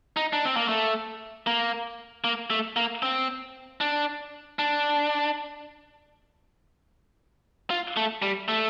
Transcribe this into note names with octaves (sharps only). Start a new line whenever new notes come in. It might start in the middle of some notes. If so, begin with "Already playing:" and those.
D#4
D4
C4
A#3
A3
A#3
A#3
A3
A#3
C4
D4
D4
F4
A3
G3
A3